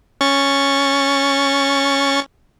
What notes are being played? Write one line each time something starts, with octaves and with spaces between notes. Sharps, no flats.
C#4 C#6 A6